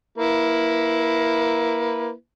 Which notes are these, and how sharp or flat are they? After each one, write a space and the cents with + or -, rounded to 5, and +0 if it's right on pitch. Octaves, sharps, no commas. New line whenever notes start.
A#3 +10 E4 +0 B4 +0